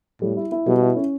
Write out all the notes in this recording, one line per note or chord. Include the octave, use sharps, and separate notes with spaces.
A2 G3
E4
E4
B2 G3
E4
C#4